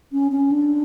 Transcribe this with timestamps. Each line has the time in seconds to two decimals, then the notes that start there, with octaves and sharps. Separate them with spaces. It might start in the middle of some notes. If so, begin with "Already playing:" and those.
0.12 C#4
0.32 C#4
0.51 D4